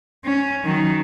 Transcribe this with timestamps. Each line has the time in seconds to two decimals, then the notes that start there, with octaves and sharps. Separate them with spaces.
0.25 C#4
0.65 D#3 F#3